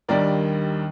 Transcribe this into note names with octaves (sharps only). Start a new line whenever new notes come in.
D#2 D#3 G3 A#3 D4 A#4 D5